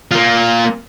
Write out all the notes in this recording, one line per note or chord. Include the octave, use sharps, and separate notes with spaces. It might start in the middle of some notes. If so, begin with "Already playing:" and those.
A#3 F4